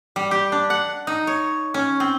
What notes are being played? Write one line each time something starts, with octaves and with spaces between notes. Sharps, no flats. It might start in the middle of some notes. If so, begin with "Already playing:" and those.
G3
G4
D4
F#5
D#4
C#5
C#4
C4